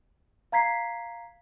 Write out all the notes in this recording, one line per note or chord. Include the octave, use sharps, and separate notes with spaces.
F5 A#5 G#6 B6 C7